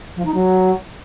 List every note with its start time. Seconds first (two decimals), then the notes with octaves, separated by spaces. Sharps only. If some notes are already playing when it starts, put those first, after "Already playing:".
0.16 F3
0.25 D#4
0.34 F#3